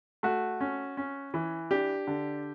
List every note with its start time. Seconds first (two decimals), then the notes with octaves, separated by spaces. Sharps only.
0.23 A3 F#4
0.61 C#4
0.97 C#4
1.34 E3
1.71 D4 G4
2.07 D3